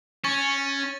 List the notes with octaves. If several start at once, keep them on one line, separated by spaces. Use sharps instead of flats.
C#4 C#6 A6